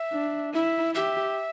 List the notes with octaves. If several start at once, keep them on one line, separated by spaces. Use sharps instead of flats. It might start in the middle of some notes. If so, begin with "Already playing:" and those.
Already playing: E5
D4
E4 E5
G4 E5